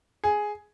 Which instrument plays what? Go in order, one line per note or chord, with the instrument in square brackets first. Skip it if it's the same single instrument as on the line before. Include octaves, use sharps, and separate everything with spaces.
[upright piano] G#4